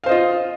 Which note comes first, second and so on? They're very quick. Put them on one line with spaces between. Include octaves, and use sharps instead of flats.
F5 C5 D#5 F4